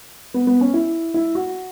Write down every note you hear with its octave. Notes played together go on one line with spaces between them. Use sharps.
B3
B3
C#4
E4
E4
F#4